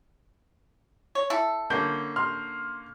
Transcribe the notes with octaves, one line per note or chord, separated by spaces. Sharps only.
C#5
E4 A4
D3 A#3 C#4 G6
C6 F6